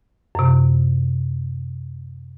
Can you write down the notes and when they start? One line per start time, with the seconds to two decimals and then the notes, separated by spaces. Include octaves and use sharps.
0.35 F#2 C3